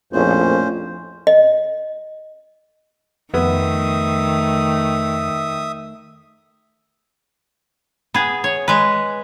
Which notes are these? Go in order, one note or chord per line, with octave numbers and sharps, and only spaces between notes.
A#1 F2 A2 C#4 C5
D#5
F2 D#3 A3 B3 E5 D#6
B3 G#4
C#5
G#3 B4